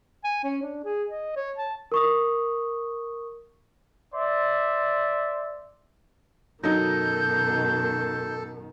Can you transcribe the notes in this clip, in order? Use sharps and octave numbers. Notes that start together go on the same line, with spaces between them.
G#5
C#4
D4
G#4
D#5
C#5
A5
A#4 C#6 D#6
C5 D5 E5
F#2 B2 D#3 F#3 D#4 A4 G6